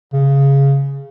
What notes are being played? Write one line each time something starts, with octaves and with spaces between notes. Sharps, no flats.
C#3